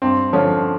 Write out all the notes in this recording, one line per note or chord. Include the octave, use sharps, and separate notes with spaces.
G2 C4
D3 F3 C#4